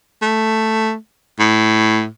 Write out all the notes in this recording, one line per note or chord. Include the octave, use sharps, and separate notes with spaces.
A3
A2